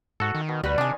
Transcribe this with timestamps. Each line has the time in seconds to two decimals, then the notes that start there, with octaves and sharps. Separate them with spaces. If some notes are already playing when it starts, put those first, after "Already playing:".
0.20 G#2 F#4 A4
0.35 D#3
0.49 B2
0.64 D2 G3 F#4 B4
0.78 C3 D#3 D4 G#5